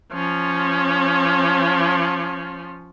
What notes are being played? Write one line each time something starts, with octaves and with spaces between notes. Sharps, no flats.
F3 C#4